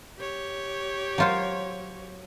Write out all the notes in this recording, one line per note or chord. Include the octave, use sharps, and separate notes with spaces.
G4 C#5
F#3 F4 C5